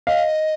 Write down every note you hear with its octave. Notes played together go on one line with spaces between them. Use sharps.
D#5 F5